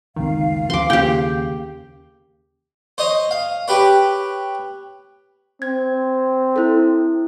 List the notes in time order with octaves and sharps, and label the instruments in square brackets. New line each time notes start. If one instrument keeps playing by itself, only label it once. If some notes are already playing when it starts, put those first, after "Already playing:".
[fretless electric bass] F#1 C#2 C4 [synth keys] D#3 [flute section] F5
[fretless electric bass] D2 F3 [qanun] C6 D6 [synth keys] C7
[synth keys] D#2 C#3 [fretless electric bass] A#3 [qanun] G4 G5
[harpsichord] C5 C#5 D#5
F5
G4 B4 C#5
[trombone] C4 [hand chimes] G#6
[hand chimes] E4 A4